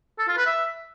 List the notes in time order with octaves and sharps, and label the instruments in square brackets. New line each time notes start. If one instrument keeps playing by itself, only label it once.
[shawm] A4
F4
B4
E5